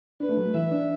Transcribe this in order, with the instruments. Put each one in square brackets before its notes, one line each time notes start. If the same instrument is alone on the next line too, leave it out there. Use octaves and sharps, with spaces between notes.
[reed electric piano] D4 [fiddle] B4
[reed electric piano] A3
F#3
A3
[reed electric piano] E3 [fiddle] E5
[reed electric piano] D4